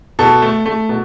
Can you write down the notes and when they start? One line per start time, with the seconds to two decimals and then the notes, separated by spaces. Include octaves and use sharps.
0.19 B2 A4
0.42 A3
0.66 A3
0.89 B2